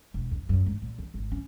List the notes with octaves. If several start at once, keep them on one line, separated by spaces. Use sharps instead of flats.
E1
E2
F#2
G#2
A#2
E2
G#1
C#4